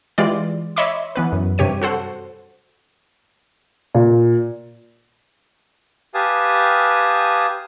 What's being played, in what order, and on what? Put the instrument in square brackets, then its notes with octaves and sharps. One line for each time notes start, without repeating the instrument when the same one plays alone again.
[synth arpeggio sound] E3 G#3 F4 G4 D5
C#5 D#5 E5 B5 C6 D6
E3 B3 B4
F#2
G2 C3 G4 C#5 D#7
F#4 A4 C5 F#5
[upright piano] A#2
[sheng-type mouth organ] G4 B4 F5 G#5 A5 D#6